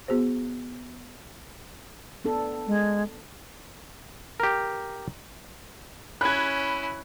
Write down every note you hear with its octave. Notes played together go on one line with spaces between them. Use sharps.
B3 F#4 G#4 C5
B3 D4 A4
G#3
G4 A#4
C#4 E4 B5 F#6 G#6